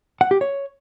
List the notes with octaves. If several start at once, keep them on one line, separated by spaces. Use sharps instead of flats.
F#5
G4
C#5